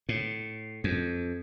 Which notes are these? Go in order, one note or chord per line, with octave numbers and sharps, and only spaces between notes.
A2
F2